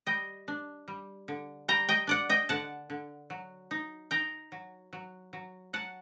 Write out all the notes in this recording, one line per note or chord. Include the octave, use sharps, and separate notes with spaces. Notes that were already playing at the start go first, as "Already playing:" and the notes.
G3 D#5 G5
D4
G3
D3
G3 G5 A#5
D#5 G5
D4 D5 F#5
D#5 G5
D3 F#5 A5
D3
F#3
D#4
D#4 G5 A#5
F#3
F#3
F#3
F#3 F#5 A5